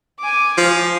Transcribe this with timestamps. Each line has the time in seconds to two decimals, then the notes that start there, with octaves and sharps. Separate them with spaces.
0.19 G#5 D6
0.58 F3